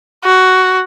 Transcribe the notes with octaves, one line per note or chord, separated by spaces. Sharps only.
F#4